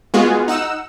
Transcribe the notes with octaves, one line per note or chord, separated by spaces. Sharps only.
G#3 B3 F4 F#4 G#4
D#4 F#5 E6 E7